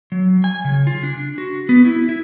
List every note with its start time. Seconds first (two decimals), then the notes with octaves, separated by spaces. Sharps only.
0.12 F#3
0.44 G#5
0.64 C#3
0.87 F4
1.03 D4
1.38 F#4
1.69 B3
1.85 E4
2.09 E4